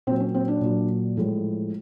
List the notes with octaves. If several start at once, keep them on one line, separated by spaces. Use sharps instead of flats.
A#2 F#3 C4
C#4
C4
D4
A#2 F#3
A2 F3 G#3